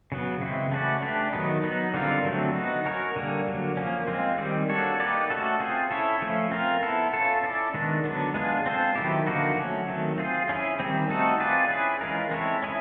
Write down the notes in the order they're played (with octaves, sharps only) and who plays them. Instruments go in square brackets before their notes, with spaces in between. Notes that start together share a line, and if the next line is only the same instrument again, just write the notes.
[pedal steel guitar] C#3 F#3 B3
C#3 E3 G#3 C4 E4
A3 C#4 F#4 B4 D5
A3 D4 G4 B4
D#3 F#3 B3 D#4
F#3 B3 D#4
D3 G3 C4 F4 A#4
D3 F#3 A3 C4
B3 D#4 F#4
C#4 F#4 A#4 C#5
D3 G3 A#3
D3 F#3 A#3
F3 A#3 C#4
G#3 C4 F4
D#3 G3 C4
A#3 D4 F#4 A4 C#5
A#3 D#4 G4 B4 D5
A3 C#4 F#4 A4
C4 F4 G#4 C5
C#4 E4 A4 C#5
F3 A3 C#4
C4 F4 A#4
B3 E4 A4
C#4 F4 A4
C#4 E4 A4 D5
D#3 G#3 B3 D4
D3 F#3 B3 D4
G#3 B3 D4 F4 G#4
C4 F4 A4 C5
D#3 F#3 B3 E4 G4
D3 F3 A#3 D#4 F#4
F#3 A3 C#4
D#3 F#3 A3 C4
C4 F4 G#4 C5
C#4 E4 G#4
D#3 G3 C4
A3 C4 D#4 F#4 A4
C4 F4 G#4 B4 D5
C#4 E4 G#4 B4
E3 G#3 C#4 F4 A#4
G#3 C4 E4 A4 C#5
C#4 E4 G#4